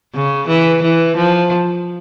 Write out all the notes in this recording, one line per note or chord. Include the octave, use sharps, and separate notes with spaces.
C#3
E3
E3
F3